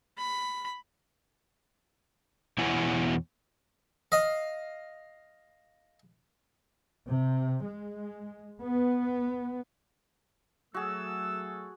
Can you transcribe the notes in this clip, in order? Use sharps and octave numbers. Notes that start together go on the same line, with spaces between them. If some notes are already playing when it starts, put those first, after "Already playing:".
B5
E2 B2 E4 C#5 F#5 G#5
D#5 F5
C3
G#3
B3
F#3 A3 F#4 G#4 A4 E6